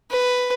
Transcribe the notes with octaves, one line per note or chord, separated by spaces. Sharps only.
B4